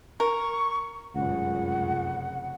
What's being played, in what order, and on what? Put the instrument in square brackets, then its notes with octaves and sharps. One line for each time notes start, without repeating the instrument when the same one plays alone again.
[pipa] A#4 [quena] C#6
[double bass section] F1 F#2 C#3 [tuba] C#2 [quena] F#5